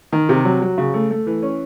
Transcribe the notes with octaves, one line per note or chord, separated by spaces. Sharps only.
D#3
C3
F#3
F#3
C#3
A3
A3
E3
C#4